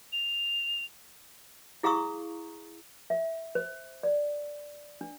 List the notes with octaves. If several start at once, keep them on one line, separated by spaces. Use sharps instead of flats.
F7
E4 G#4 F5 A#5 C#6 D#6
E5
C5
D5
D4